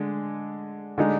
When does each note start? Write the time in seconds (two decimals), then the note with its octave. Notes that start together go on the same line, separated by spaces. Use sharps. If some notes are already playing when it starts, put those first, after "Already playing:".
Already playing: D3 G#3
0.98 D3 G#3 D#4